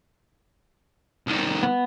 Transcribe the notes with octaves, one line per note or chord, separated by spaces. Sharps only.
C2 D#3
B3